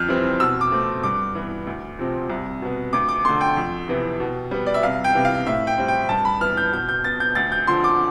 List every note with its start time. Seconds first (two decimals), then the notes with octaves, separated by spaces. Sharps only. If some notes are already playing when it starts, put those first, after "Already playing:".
Already playing: F2 F6 G6
0.08 E3 G3 C4
0.40 B2 E6
0.61 D6
0.72 A3 C4
1.03 G2 D6
1.35 E3 B3
1.67 D2
1.99 C3 F3 C4
2.30 C2
2.62 B2 B3
2.93 D2 D6
3.09 D6
3.25 D3 A3 C6
3.41 G5
3.57 F2
3.88 C3 E3 B3
4.20 B2
4.51 G3 B3
4.66 D5
4.74 E5
4.83 C2 F5
5.04 G5
5.15 C3 E3 B3
5.25 F5
5.46 A2 E5
5.67 G5
5.78 G3 C4
5.88 G5
6.09 G2 A5
6.25 B5
6.41 E3 B3 F6
6.57 G6
6.73 B2 G6
6.89 G6
7.04 B3 A6
7.20 G6
7.35 D2 A6
7.52 G6
7.67 D3 F3 C6
7.84 D6